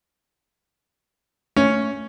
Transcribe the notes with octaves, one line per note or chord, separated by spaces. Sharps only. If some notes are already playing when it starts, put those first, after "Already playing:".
A3 C#4